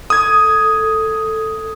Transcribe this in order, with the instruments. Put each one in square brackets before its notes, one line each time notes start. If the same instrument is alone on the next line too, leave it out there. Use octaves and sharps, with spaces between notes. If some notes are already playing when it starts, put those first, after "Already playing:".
[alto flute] A4 [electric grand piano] D#6 G#6